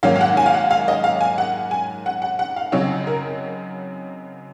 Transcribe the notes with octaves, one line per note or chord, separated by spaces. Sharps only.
G#2 D#3 F#3 A#3 C#4 F5
F5
F#5
G#5
F5
F#5
F5
D#5
F5
G#5
F#5
G#5
F#5
F#5
F#5
F5
F#2 C#3 F#3 C4 D#4 C#5
A#4